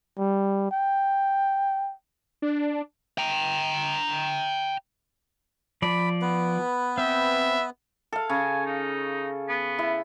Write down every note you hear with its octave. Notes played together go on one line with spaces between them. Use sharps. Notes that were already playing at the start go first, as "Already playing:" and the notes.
G3
G5
D4
G5 A#5
F3 D5 B5
B3 B4
C4 E5
A4 F5
C#3 G#5
D#4
B3
E4